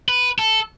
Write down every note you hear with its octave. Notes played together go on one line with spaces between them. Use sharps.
B4
A4